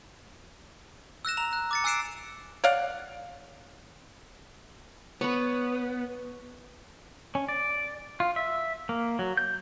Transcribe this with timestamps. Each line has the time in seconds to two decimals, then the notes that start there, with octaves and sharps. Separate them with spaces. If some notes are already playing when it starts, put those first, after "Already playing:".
1.25 E6 F#6 A#6 E7
1.37 A#5 E7 F7
1.53 F#6
1.71 D6 A6 C#7
1.84 G#5 E6 F#6 C7 D7 E7
2.64 C#5 D5 F5 F#5
5.21 B3 B4 C#5
7.35 C#4
7.49 D5
8.20 F4
8.36 E5
8.89 A#3
9.19 F#3
9.37 G6